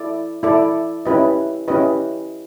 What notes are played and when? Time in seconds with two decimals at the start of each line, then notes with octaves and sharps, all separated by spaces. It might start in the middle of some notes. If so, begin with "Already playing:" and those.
Already playing: E4 A4 D5
0.43 E4 A4 D5
1.06 C#4 E4 G4 B4 D#5
1.68 C#4 E4 G4 B4 D#5